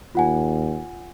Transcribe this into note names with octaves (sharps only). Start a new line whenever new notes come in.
D#2 F4 F#5 G#5